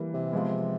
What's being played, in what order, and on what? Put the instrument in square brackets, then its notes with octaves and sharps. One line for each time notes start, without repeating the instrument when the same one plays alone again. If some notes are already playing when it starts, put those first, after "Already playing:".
Already playing: [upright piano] E3 G3 A#3
[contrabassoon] C3
[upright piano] F3 G#3 B3